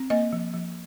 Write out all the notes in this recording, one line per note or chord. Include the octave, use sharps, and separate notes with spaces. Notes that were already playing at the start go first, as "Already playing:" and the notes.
Already playing: C4
A#3 D#5
F3
F3